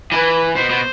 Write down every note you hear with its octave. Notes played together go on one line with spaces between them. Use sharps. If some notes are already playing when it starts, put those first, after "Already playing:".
E3 B4
B2 C5
B2